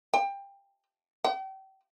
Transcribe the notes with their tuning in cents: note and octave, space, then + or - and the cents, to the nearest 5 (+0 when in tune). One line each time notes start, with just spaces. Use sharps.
G5 +20
G5 -35